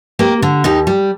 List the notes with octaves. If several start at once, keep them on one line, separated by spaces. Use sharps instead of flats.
A#3 G4 A#4
D3
D#2 D#4 G4
G3